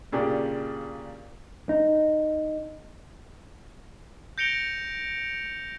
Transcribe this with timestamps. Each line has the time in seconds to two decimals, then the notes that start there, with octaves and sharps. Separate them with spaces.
0.12 A#2 C#3 D4 G4
1.69 D#4
4.38 G6 A#6 C#7 D7 F7 G7